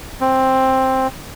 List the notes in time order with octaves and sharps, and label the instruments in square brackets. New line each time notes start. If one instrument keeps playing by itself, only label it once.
[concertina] C4